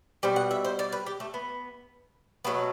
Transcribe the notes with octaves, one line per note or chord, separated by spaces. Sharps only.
B2 G3 C5
F#5
E5
C5
D5
B4
G4
A3
B3
B2 F#3 A3 B3